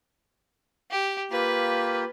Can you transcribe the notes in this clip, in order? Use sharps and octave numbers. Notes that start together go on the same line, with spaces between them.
G4
A#3 F4 G4 B4